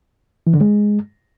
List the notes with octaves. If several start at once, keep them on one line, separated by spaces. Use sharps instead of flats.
E3
D3
G#3